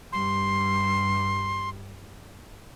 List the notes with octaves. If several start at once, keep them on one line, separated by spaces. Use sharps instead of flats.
G2 G3 C6